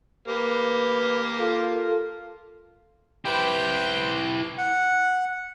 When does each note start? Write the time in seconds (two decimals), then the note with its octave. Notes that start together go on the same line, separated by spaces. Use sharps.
0.28 A#3 G4 B4
1.39 F4 A4
3.25 E4 G4 B4 C5 G5
4.58 F#5